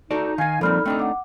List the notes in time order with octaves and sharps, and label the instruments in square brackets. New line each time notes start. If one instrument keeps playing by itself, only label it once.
[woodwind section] D#4 [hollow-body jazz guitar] F#4 A4 D5
[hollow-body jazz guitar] D#3 D#4 [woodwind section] F5 G#5
[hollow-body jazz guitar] F3 A#3 C4 [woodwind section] G3 D#4 [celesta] A4 B5 F6
[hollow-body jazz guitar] A3 D4 D#4 [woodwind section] C4
[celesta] F#5 D6